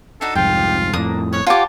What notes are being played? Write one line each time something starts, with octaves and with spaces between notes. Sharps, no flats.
D4 D#4 F#4 A4
C2 F2 G#2 F4 G4
F2 A2 A#3 D4 D#6
C#5 F#6
F4 G4 C#5 F#5 A5 D6